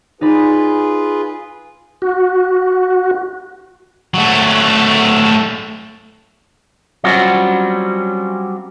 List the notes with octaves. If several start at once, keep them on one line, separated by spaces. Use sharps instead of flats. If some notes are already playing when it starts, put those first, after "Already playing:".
D#4 F4 G#4 B4 D5 B5
F#4
F#3 A3
F#3 G3 C4 C#4 F4 F#4